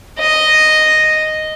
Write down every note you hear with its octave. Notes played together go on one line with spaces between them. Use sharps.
D#5